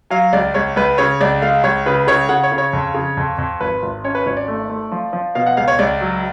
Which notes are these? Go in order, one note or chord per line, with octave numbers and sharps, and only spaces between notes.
F#3 F5
C#2 D5
C#2 C#5
C#2 B4
C#3 C#5
C#2 D5
G#3 F5
C#2 C#5
C#3 B4
C#3 C#5
C#3 F#5
C#5
C#3
C#5
F2
C#3
F2
F2
G#1 B4
G#1
C#4 C#5
B4
G#1 C#5
D5
A3
A3
F3
F3
B2 F5
F#5
C#2 F5
C#5
C#2 D5
F#3